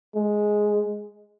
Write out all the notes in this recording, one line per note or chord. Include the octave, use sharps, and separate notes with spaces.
G#3